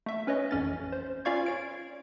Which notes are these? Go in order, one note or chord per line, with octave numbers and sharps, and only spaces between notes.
A3 E5
C#4 B4 C#5 D#5
A1 F2 C#4 A6
C5
C#4 F4 D5 F5 C#6 G#6
C#5 D7